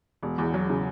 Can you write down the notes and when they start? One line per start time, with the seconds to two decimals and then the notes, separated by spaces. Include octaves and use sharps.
0.23 E1
0.38 E2
0.54 F#3
0.70 C#3